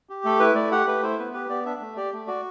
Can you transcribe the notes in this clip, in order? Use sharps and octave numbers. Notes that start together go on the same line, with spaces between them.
G4
A3 A4
E4 B4
A3 D5
G4 F#5
A3 B4
E4 C5
B3 B4
G4 B4
B3 D5
D4 E5
A3
G4 D5
A3
F#4 D5